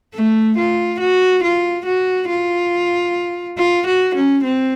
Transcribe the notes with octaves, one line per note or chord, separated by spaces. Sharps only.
A3
F4
F#4
F4
F#4
F4
F4
F#4
C#4
C4